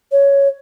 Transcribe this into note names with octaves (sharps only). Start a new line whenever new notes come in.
C#5